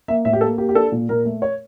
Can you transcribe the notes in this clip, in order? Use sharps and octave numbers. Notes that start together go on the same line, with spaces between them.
A#3 E5
A2 E5
G4
A#3 A4
A#3 G4
G4
D4 A4
A#2
A#2 A#4
A3
C#5